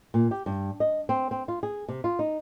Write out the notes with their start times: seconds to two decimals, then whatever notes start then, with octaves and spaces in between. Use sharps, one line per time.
0.14 A#2
0.31 G4
0.46 G2
0.80 D#5
1.09 C4
1.31 C4
1.48 F4
1.63 G#4
1.88 C3
2.04 F4
2.19 D#4